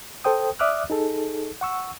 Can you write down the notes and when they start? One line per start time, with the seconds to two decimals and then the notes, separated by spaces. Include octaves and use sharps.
0.24 A4 C5 G5 D#6
0.59 D5 E5 D6 D#6 F6 F#6
0.90 D#4 G#4 A4
1.61 F#5 C#6 E6